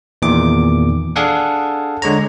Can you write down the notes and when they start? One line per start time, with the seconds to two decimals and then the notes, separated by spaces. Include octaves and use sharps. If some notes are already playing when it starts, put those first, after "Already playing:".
0.22 E2 A#2 D#3 D6
1.16 D4 G#4 A4 F5 F#5
2.02 D3 G#3 C#5 A#5